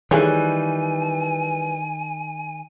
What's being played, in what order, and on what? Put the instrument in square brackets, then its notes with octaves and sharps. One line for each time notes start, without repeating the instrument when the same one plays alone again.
[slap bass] D#3 [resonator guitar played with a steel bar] E3 G3 [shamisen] A3 G#4 C#5 [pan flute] G#5